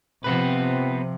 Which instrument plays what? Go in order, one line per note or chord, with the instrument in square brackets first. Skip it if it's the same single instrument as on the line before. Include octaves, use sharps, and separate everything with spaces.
[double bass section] C3 F3 [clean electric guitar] B3 C4 B4